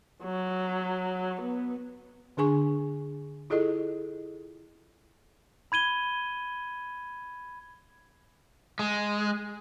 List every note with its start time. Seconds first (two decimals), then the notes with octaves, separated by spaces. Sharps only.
0.23 F#3
1.41 B3
2.37 D3 D4 G#4 G#5 C#6
3.50 E4 F4 G#4 A4 D#5
5.72 B5 G#6 D#7 G7
8.79 G#3